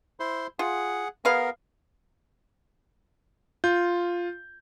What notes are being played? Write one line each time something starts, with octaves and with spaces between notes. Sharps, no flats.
E4 C5 C6
F4 G#4 F#5
B3 G#4 A#4 B4 F5
F4 G6